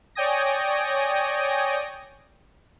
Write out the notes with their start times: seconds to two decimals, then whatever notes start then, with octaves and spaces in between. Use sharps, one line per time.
0.15 C#5 D5 G5 G#5 D#6 A#6